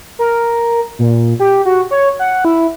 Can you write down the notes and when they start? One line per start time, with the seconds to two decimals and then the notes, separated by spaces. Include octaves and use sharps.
0.19 A#4
0.99 A#2
1.40 G4
1.65 F#4
1.91 C#5
2.19 F#5
2.45 E4